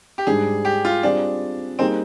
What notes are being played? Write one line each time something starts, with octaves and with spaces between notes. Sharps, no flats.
G4
G#2 G3 D4 G#4
G4
F4
G3 C4 D4 F4 G#4 D5
G3 A#3 C4 D#4 G#4 C5